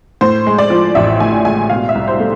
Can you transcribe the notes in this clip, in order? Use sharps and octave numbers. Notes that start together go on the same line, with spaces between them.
A2 C5
G#3
D5
F3
A1 E5
A2 G#5
G#3 G#5
B2 F5
E5
C2
C5
A3